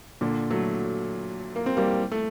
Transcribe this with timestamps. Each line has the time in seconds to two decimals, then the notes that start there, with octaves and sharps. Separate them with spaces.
0.21 A#2 D3
0.50 F#3 A3
1.56 A#3
1.66 C4
1.77 G3 A#3
2.12 A3